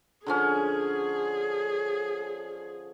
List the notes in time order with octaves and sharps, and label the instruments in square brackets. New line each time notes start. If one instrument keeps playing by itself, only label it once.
[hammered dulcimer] D3 F3 C#4 [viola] G#4